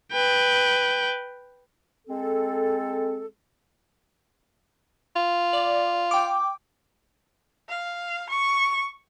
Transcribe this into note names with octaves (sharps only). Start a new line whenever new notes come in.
B4 G5
G#3 C4 A4
F4
D5
G5 D6
F5
C#6